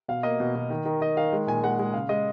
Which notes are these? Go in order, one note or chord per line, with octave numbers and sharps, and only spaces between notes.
B2 F5
A#3 D#5
B2
B2
D#3
D#3
D#3 D#5
D#3 F5
G#3
A#2 G#5
G#3 F#5
G#3
C#3 F5
G#3 D#5